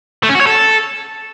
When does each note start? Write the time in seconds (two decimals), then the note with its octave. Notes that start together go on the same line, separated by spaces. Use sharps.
0.23 A3
0.29 C#4
0.35 F#4
0.41 C#5
0.47 A4